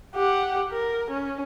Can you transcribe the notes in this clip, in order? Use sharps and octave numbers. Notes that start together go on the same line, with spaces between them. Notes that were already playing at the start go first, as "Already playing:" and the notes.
G4 F#5
A#4
C#4